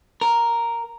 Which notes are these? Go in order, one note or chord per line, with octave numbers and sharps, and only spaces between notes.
A#4